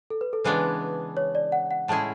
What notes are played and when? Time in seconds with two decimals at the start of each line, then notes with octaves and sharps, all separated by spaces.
0.10 A4
0.21 B4
0.33 A4
0.44 C#3 E3 G#3 B3 D4 B4
1.17 C#5
1.35 D5
1.52 F#5
1.71 F#5
1.88 A2 G#3 C#4 E4 G#4 A5